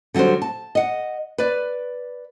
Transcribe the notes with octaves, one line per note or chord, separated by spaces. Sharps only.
D3 F#3 G3 F#4 C5
A5
D#5 F#5
B4 D5